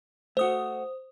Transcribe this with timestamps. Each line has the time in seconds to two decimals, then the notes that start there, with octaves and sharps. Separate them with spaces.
0.37 A3 F#4 C5 D#6